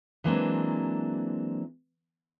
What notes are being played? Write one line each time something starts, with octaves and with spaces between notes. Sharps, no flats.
E3 F#3 G#3 A#3 C4 D4